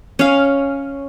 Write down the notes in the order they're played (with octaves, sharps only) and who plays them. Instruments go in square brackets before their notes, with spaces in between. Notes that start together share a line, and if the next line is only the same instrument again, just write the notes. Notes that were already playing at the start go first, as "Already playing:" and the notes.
[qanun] C#4 F5